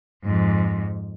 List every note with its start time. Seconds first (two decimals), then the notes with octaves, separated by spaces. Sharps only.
0.24 F2 G#2